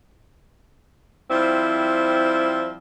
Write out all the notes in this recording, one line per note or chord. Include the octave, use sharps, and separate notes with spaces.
F3 G3 C4 E4